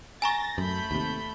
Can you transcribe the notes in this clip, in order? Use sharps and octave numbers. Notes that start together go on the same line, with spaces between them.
G#5 A#5 C#6 A6 A#6
F#2 A3 B5 G6
D#2 C3